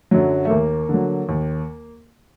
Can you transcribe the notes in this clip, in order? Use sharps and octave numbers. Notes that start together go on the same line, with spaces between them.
F#2 D3 F#3
A3
D#2 A#3
D3 F#3
D#2